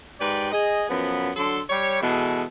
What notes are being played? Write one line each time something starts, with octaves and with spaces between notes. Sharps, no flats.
G#2 G4 B4 D5 G5
G#4 D#5
F#2 F3 B3
D3 F#3 A4 C6
G3 C#5
B2 E3 G#3 G#4 A4